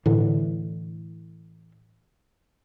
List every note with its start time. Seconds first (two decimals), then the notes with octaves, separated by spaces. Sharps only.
0.06 A2 D3 E3